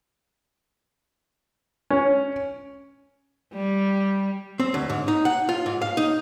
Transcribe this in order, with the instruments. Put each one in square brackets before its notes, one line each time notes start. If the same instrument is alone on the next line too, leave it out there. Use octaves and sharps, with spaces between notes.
[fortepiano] C#4
[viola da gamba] G3
[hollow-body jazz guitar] C4
D2
G#2
D#4
F#5
F4
G#2
F5
D#4